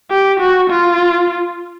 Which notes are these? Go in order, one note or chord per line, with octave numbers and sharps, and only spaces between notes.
G4
F#4
F4